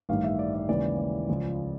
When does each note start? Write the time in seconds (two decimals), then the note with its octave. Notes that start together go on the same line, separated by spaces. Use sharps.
0.09 A1 G2 D#3 F5
0.24 E5
0.39 D5
0.54 D5
0.68 D#2 C#3 E3 G#3 D5
0.98 D5
1.29 C#2 C#3 F3 G#3